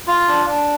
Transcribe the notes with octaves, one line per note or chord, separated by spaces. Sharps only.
F4
D4
D4